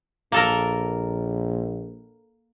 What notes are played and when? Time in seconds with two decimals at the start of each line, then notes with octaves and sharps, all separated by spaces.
0.32 A#1 A#3 A4 A#4